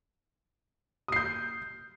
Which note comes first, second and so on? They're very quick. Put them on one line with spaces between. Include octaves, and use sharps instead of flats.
D#6 C7 G6